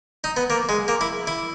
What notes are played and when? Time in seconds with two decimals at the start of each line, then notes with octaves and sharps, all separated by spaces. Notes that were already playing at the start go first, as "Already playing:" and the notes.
0.24 D#4
0.37 B3
0.50 A#3
0.69 G#3
0.88 A#3
1.01 E4
1.27 E4